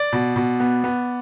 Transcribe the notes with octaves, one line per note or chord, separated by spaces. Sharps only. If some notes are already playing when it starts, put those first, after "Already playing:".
Already playing: D5
B2
B2
B3
B3